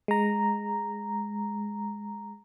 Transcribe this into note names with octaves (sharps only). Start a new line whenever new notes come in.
G#3 A#5